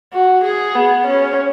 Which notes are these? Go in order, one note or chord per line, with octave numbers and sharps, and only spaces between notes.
F#4
G#4
B3
C#4